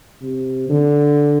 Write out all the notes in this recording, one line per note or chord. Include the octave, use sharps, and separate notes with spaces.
C3
D3